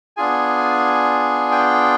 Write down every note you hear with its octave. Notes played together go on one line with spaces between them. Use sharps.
B3 D4 F4 G#4 G#5
G5